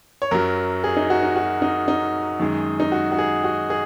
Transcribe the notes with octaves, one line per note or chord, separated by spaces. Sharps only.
C#5
F#2 F#3 A#4
G#4
D#4
F#4
D#4
F#4
D#4
D#4
F#2 D#3 G#3
D#4
F#4
F#4
G#4
F#4
G#4